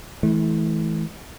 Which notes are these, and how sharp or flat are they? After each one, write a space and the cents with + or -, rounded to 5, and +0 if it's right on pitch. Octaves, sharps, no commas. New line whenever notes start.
E3 -25 A3 -40